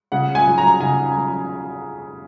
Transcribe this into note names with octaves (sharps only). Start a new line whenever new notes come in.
C#3 F#5
G#5
F#3
A#5
C#3 G#5
F#3